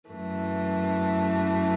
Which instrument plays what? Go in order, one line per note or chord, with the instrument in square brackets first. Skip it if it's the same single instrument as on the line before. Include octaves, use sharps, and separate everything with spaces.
[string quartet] F#2 E3 A3